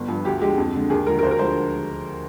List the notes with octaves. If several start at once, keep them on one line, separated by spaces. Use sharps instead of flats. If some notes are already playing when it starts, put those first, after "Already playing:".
Already playing: G1
G2 F3
D2 G4
D3 F3 G#3 G4
F2
D3 G#3
D#2 G#4
D3 F3 G#3 A#4
A#4
D2 C5
A#4
D3 F3 G#3 C5